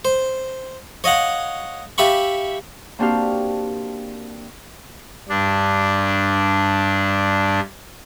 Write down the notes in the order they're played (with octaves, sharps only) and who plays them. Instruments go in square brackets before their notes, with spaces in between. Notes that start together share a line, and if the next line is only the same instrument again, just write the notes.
[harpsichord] C5
C#5 D#5 F5 F#5
G4 E5 F5 B5 C#6
[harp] A#3 C4 D4 F#4 G4 F5
[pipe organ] G2 D4